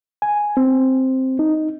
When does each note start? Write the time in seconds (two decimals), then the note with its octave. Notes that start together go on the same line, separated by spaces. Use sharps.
0.22 G#5
0.57 C4
1.39 D#4